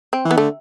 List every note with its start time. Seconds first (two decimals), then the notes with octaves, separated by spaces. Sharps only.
0.13 C4
0.25 E3
0.31 B3
0.37 D3 A3